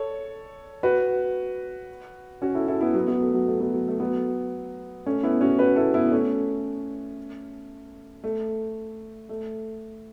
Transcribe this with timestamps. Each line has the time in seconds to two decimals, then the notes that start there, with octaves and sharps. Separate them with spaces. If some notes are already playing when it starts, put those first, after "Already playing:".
Already playing: A4 C#5
0.83 F#4 B4
2.42 C#4 F#4
2.54 E4 A4
2.68 E4 A4
2.81 B3 E4
2.94 F#3 B3
3.08 F#3 B3
3.21 A3
3.34 F#3
3.48 A3
3.60 F#3 B3
3.74 F#3
3.88 A3
4.00 F#3 B3
5.06 A3 C#4
5.23 B3 E4
5.41 C#4 F#4
5.59 F#4 B4
5.76 E4 A4
5.94 B3 E4
6.12 A3 C#4
8.24 A3
9.29 A3